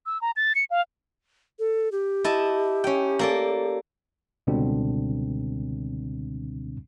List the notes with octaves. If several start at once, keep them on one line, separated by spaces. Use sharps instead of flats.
E6
A#5
A6
C#7
F5
A4
G4
E4 D#5 A5
C#4 G5
A#3 A4 D5
C#2 B2 D3 G3 C4 D4